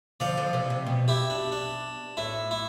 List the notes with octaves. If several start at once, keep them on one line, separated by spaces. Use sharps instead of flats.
D3 F3 D5 F5
D3 F3
C3 E3
C3
B2
E4 G4
D4
D4
A2 E4
E4